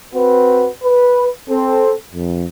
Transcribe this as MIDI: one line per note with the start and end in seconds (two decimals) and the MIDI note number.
0.14 0.69 60
0.14 0.69 66
0.14 0.69 71
0.84 1.29 71
1.49 1.94 60
1.49 1.94 69
2.13 2.45 41